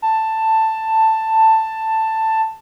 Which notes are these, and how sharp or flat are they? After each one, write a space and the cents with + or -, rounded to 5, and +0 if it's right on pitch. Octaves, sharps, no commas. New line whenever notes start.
A5 +10